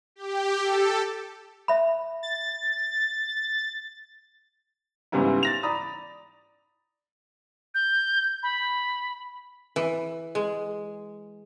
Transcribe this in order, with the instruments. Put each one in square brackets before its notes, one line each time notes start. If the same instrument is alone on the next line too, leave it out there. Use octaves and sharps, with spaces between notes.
[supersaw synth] G4
A4
[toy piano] E5 B5
[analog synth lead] A6
[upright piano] G#2 C#3 E3 G3 B3 E4
A6 A#6 F7
D5 A#5 B5 D#6
[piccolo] G6
B5
[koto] E3
G#3